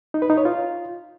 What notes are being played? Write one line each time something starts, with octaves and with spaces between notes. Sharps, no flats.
D#4
B4
D#4
C#5
F4